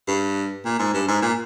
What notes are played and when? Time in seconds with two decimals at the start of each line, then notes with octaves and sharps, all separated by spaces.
0.08 G2
0.65 A#2
0.79 G#2
0.94 G2
1.08 G#2
1.22 A#2